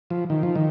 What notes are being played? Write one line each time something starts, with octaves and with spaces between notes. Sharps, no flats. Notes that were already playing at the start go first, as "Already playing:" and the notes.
F3
D#3
F3
D#3